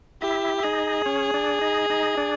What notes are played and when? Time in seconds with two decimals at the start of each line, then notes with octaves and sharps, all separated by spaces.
0.22 E4 G4 E5
0.58 E5
0.63 D#4 G#4 D#5
1.06 C#4 C#5
1.34 D4 D5
1.61 D#4 D#5
1.90 D#4 D#5
2.17 D4 D5